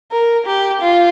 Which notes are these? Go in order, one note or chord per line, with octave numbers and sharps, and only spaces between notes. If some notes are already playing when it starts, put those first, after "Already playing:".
A#4
G4
F4